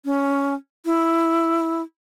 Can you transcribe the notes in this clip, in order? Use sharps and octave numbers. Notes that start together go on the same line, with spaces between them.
C#4
E4